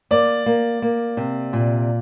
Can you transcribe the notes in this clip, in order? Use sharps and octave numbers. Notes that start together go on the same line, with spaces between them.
A#3 D5
A#3
A#3
C3
A#2